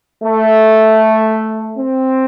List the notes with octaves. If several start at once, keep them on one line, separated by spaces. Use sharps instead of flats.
A3
C4